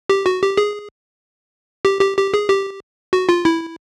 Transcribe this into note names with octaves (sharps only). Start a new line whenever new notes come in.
G4
F#4
G4
G#4
G4
G4
G4
G#4
G4
F#4
F4
E4